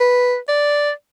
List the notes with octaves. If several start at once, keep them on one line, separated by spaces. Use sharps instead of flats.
B4
D5